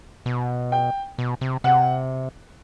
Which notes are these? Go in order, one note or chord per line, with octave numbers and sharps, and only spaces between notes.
B2
G5
B2
C3
C3 F#5